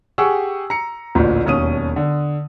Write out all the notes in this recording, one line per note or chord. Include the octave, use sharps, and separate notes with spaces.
G4 G#4 F#5 G#5 C#6 E6
A#5 C#7
A1 D2 A#2
E1 D#2 C#4 D#6 D#7
D3